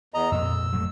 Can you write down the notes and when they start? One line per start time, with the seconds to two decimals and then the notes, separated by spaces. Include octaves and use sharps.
0.14 E2 D#5 A#5
0.32 F2 A#2 E6
0.72 F2 F#3 A3